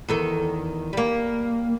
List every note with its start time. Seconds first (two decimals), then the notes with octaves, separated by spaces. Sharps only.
0.08 E2 D#3 A4
0.93 G3 A#3